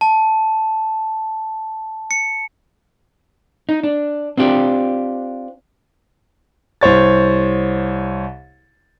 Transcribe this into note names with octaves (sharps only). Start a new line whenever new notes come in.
A5
C#7
D#4
D4
C4 D4 F4 G4
C2 C5 C#5 A6